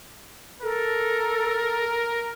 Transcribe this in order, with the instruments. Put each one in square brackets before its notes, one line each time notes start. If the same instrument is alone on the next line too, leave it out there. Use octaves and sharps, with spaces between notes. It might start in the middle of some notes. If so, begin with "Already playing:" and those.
[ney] A4 [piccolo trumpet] A#4